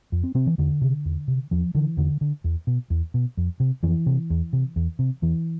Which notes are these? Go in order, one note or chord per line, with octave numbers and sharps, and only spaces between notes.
F2
C4
C3 C4
E3
E2 D3
C3
E2
C3
E2 F3
D3 E3
E2 D3
D3
E2
B2
E2
B2
F2
C3
F2 E3
C3
E2
C3
E2
C3
E2 E3